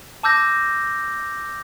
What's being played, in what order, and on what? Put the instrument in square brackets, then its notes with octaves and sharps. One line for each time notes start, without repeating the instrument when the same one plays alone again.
[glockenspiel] A5 D6 E6 G6 A#6